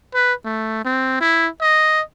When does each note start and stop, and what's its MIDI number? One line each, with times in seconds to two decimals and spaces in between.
0.14 0.33 71
0.45 0.82 57
0.85 1.18 60
1.21 1.49 64
1.61 2.02 75